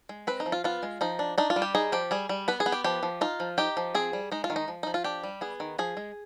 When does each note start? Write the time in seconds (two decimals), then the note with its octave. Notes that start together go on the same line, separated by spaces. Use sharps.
0.09 G#3
0.27 C4 B4
0.40 D#4
0.46 F3
0.52 F4
0.64 B3 F4
0.83 G#3
1.01 F3 D#4
1.19 D4
1.38 D4 D#4
1.50 F4
1.56 G3
1.62 G4
1.75 D#4 G#4
1.92 F3 G4
2.11 G3 G#4
2.29 G3
2.48 B3 B4
2.60 G#4
2.66 B3
2.72 G4
2.84 F3 G4
3.03 F3
3.21 D#4 F4
3.40 F3
3.58 D#4 G4
3.77 F3
3.95 C4 G#4
4.13 G3
4.32 G#3 D#4
4.44 F4
4.50 D#3
4.56 D#4
4.68 F3
4.83 F3 D#4
4.94 F4
5.04 D4 G4
5.23 G3
5.41 B3 G#4
5.60 D#3
5.78 F3 G#4
5.97 G#3